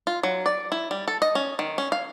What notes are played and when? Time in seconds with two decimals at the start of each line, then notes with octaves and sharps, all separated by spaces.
0.07 F4
0.23 F#3
0.46 D5
0.72 E4
0.91 G3
1.08 A4
1.22 D#5
1.35 C#4
1.59 D#3
1.78 C#4
1.92 F5